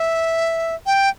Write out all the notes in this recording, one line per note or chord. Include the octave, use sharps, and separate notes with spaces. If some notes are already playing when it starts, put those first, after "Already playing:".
Already playing: E5
G5